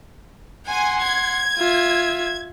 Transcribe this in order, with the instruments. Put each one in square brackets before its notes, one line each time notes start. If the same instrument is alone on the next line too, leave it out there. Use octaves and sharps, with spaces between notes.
[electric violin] F#5 C6 [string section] G#5
[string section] G#6
[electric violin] F4 E5